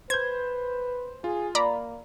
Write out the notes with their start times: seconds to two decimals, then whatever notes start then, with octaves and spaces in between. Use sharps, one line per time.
0.10 B4 C5 G6 G#6
1.24 F4 G#4
1.55 A#3 D5 A#5 B5